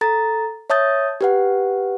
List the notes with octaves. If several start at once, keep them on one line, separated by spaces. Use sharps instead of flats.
A4 A#5 A6
C#5 E5 A5 D#6 G6 A6
G4 B4 F#5